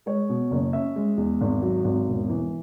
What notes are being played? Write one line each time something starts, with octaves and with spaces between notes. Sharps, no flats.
G#3 C#5
B2
F#1
C#4 E5
G#3
E2
G#1
F#3
G#1
E1
E3